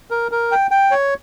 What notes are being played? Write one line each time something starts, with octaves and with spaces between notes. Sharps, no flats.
A#4
A#4
G5
G5
C#5